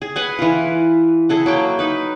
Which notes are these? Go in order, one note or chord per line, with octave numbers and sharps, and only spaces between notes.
G#4
B4 F#5 G#5
E3 F4
E4 G#4 A4 F#5
F#3 A#3 G5
D#4 B4